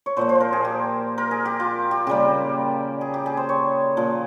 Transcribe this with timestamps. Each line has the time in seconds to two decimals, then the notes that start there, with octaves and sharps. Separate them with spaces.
0.06 C#5
0.17 A#2 F3 A#3 C5
0.29 C5
0.40 A#4
0.52 G#4
0.65 G4
1.18 A#4
1.31 G#4
1.46 G4
1.60 F4
1.91 G4
2.07 C#3 G3 A#3 G4
3.01 G#4
3.14 G4
3.26 G#4
3.37 C5
3.49 C#5
3.97 A#2 F3 A#3